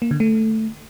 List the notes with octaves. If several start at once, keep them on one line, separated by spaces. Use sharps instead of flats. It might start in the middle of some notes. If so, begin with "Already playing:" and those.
A#3
D3
A3